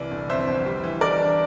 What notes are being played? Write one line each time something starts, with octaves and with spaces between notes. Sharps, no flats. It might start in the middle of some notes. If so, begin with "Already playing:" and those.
Already playing: C2 E3 D5
G1
F2 C5 E5
G1
G3
E3
E3 A#4 D5
D4